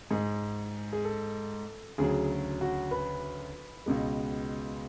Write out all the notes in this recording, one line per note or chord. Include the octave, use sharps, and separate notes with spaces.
G#2 G#3 G#4
G#4
A4
D2 C#3 F#3 G#4
F#4
B4
C#2 B2 G#3